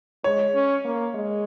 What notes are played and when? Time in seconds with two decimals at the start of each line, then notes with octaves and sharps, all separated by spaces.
0.24 G#3 C#5
0.54 C#4
0.85 A#3
1.15 G#3